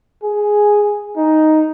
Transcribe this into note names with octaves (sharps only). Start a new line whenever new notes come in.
G#4
D#4